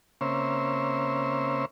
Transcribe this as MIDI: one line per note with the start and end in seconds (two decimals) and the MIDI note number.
0.21 1.65 49
0.21 1.65 58
0.21 1.65 60
0.21 1.65 61
0.21 1.65 72
0.21 1.65 76